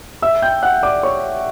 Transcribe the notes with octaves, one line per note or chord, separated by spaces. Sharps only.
E5 E6
G5 G6
F#5 F#6
D5 D6
C#5 C#6